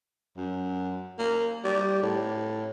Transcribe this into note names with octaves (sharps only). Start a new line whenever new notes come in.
F#2
A#3
G3
A2